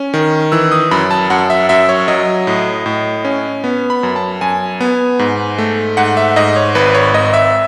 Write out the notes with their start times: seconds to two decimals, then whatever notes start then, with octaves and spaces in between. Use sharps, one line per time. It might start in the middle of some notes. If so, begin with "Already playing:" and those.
Already playing: C#4
0.14 D#3
0.52 E3 E6
0.72 D#6
0.91 F#2 B5
1.11 A5
1.30 F#2 F#5
1.50 E5
1.69 F#2 E5
1.89 C#5
2.08 F#3 D#5
2.47 A2
2.86 A2
3.25 C#4
3.64 B3
3.90 B5
4.03 F#2
4.16 A5
4.41 F#2 G#5
4.81 B3
5.19 G#2
5.58 A3
5.97 G#2 F#5
6.17 E5
6.36 G#2 D#5
6.56 C#5
6.75 G#1 B4
6.94 C#5
7.14 G#1 D#5
7.33 E5